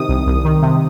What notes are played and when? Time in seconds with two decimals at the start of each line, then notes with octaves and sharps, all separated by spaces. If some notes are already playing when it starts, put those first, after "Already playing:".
Already playing: C3 D#3 D#6
0.09 C2
0.27 C2
0.45 D#3
0.62 C3